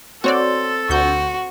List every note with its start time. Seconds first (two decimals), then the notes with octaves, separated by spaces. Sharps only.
0.24 C4 F#4 A4 C#5 D5
0.90 D2 F#4 G6